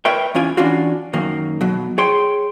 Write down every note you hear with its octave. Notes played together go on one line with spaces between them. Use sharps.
A#4 B4 C#5 E5 G5
E2 C#4 F4 G#5
E3 C#4 D4 F4 F#4
F#2 D#3 A#3
B2 F#3
G#4 C#5 G5 C6